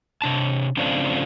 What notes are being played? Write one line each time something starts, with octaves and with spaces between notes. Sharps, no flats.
C3 D4 A5
C#3 F3 A3 C4 D4 F4